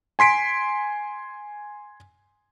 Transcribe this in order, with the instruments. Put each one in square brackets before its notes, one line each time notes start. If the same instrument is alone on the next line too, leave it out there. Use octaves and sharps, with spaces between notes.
[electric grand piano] G#5 C6 B6 D7